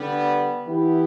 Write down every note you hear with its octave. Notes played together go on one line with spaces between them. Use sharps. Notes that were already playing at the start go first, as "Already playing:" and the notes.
Already playing: D3 G3 B3
E3 B3 E4 G4